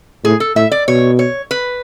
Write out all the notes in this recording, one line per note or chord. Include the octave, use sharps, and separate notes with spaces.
A2 G#4
A4
A2 E5
D5
B2 C#5
C#5
B4